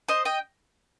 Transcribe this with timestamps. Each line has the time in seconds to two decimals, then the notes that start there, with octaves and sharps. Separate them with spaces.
0.08 C5 D#5
0.25 D#5 G5